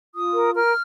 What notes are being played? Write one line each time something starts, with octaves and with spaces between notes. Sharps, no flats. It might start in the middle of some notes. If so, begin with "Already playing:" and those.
F4 D#6
A#4
A#4 F6